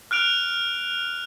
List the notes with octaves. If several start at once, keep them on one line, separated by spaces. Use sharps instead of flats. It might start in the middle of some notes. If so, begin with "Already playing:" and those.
F6 F#6 D7 F7